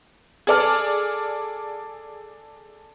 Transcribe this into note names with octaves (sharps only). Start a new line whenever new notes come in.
G#4 A4 D5 A5 F6